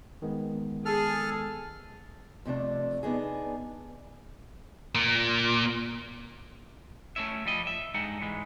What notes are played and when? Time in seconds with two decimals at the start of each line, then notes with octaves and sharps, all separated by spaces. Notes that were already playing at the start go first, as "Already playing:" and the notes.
0.22 D#3 G#3 B3
0.85 G#4 A4 F6
2.45 F2 C3 A3 D4
3.03 B3 D4 D#4 G#4
4.95 A#2
7.16 A3 A#3 C#4 E4 E5
7.45 F3 G3 D#5
7.67 E5
7.94 G2 G#3 D#4 F#5
8.21 G#2 E3 G#3